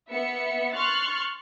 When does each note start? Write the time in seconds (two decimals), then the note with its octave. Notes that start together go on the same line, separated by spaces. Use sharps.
0.11 B3 E5 C#7
0.73 C6 C#6 F6 F#6 A6